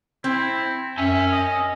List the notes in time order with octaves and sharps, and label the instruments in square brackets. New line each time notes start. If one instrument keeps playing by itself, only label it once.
[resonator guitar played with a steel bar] C4 [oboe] E4
[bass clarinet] F#2 [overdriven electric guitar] C#4 G#5 [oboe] E5
[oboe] D#5